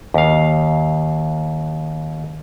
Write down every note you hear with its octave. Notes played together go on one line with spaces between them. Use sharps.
D#2 F5